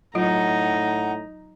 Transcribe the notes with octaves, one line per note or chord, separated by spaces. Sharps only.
A2 F#3 D#4 F4 F#5 A#5